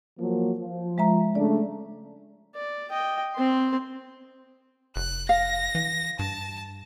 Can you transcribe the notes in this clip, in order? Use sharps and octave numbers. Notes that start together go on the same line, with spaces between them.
F3 F#3 A#3
F3
G#3 E5 A#5
C#3 A3 D4 D5
D5
D#5 G5
C4 C6
F1 F#6
F5 A#6
E3
G2 A5